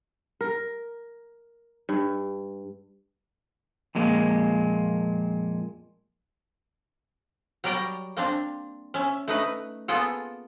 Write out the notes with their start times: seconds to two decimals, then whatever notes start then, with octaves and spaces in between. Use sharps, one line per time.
0.41 A#4
1.89 G2
3.95 F2 A#2 G#3 A#3
7.64 F#3 G3 A#4 D5 G5 A#5
8.17 A#3 C4 D4
8.94 C#4 E5
9.28 A3 D#4 B4
9.88 A#3 B3 F4 G#4 A4